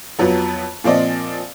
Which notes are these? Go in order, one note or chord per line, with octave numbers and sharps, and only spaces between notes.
F2 F3 F#3 B3
A#2 F3 C4 D5 D#5